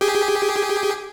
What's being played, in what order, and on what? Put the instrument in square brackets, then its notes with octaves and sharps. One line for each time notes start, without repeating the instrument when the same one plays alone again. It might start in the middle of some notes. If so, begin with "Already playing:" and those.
[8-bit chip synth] G4 G#4